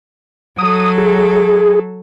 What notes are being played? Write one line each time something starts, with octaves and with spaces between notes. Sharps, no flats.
F#3 A4 D#6
G#4